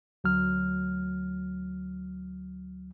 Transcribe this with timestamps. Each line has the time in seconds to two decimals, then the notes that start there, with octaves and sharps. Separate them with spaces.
0.24 D2 F#3 F6